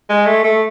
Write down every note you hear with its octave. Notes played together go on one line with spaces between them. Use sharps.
G#3
A3
A3